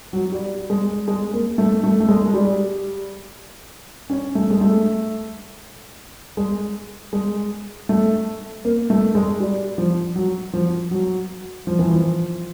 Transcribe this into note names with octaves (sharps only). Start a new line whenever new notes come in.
F#3
G3
G#3
G#3
A#3
A3
A3
A3
G#3
G#3
G3
C#4
A3
G#3
A3
G#3
G#3
A3
A#3
A3
G#3
G3
F3
F#3
F3
F#3
F3
E3
F3